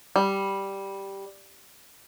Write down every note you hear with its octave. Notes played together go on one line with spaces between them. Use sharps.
G3